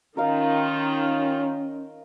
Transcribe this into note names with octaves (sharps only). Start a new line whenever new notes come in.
D#3 C#4 F4 A#4 D#5 F5